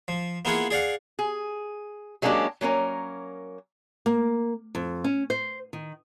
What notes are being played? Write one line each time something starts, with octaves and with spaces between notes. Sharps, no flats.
F3
A#3 B3 E4 F4 G#4 F#5
G#4 D5 F5 F#5
G#4
F#3 G#3 A#3 C#4 D4 G4
F#3 A#3 C#4 A#4
A#3
F2
C#4
C5
D#3